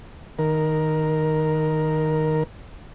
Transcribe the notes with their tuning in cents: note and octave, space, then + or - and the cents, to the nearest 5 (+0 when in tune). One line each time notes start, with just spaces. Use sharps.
D#3 +0 A#4 +5